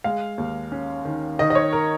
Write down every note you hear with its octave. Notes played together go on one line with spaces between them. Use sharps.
G#3 F5
D#2
C#4
D#3
D#3 D#5
D#5
C#5
A#4